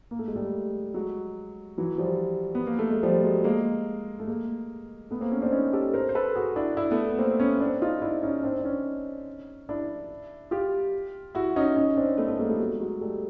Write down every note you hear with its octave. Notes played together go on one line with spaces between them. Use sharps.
A#3
A3
G#3
G3 A3
F#3 G#3
E3 F#3
F3 G3
B3
A#3
A3
G#3
F3 G3
F#3 G#3
G#3 A#3
A3
G#3 A#3
A3 B3
A#3 C4
B3 C#4
C4 D4
C#4 D#4
G4 A4
A#4 C5
C5
A4 B4
F#4 G#4
D4 E4
D4 E4
A3 B3
B3
A#3 C4
B3 C#4
C4 D4
D#4 F4
D4 E4
C#4 D#4
C4 D4
D4
C#4 D#4
D4 E4
F4 G4
E4 F#4
C#4 D#4
C#4 D#4
C4 D4
A3 B3
A3 B3
G#3 A#3
G3 A3
F#3 G#3
F#3 G#3
G3 A3